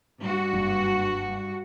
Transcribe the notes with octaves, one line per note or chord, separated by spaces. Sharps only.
G2 F#4
F#1